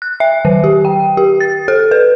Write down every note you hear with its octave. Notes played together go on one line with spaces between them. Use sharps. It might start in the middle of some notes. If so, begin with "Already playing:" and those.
F#6
E5
D#3
G4
G5
G4
A6
A4
B4